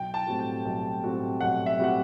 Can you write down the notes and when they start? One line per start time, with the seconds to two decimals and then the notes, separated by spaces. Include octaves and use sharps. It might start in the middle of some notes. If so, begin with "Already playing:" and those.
Already playing: B1 G5
0.14 A5
0.27 A2 G3 C4 F#4
0.39 G5
0.65 B1
1.02 A2 G3 C4 F#4
1.41 B1 F#5
1.66 E5
1.79 A2 G3 C4 F#4 F#5